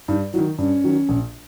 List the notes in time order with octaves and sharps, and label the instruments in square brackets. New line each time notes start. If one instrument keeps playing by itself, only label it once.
[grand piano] G2 [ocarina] D#4
[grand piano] D#3 F#3 [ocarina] E4
[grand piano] G2 [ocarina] C#4
[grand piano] D#3 F#3
A#1